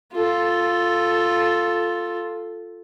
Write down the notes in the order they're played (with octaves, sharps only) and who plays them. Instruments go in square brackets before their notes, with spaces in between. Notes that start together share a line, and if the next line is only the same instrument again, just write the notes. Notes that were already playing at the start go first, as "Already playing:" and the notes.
[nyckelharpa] F4 A4